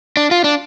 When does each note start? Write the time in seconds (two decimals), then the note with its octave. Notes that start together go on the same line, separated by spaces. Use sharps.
0.17 D4
0.31 F4
0.44 D4